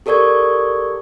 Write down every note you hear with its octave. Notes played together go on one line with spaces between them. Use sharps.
G4 A4 A#4 D5 C#6 G#6